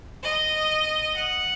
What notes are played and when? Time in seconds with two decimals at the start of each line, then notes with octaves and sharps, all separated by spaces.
0.23 D#5
1.14 F#5